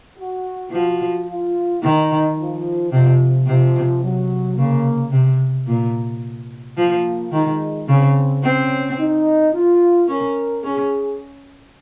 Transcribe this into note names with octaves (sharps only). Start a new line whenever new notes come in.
F#4
F3 F#4
F4
D#3 D#4
F3
C3 F3
C3 F3
F#3
C#3 A#3
C3
A#2
F3 A#3
D#3 G#3
C#3 C4
C4 C#4
D#4
F4
C#4 A#4
C#4 G#4